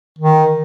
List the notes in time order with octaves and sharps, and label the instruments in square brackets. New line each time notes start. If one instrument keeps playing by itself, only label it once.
[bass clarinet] D#3